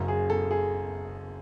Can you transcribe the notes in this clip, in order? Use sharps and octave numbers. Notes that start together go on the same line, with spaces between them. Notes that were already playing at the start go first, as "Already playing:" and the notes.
Already playing: F#1 F#2 C#3
G#4
A4
G#4